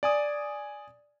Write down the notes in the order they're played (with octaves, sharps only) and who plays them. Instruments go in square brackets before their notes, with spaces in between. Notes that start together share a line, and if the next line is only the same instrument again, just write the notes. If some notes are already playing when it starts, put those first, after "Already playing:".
[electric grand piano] D5 G#5 D#6